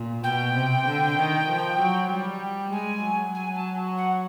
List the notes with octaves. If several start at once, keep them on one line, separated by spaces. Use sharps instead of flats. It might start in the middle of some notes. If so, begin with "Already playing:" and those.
Already playing: A#2
B2 G5
C3
D3
D#3
F3
F#3
G3
G#3 G#5
F#3
G#5
A5
F#5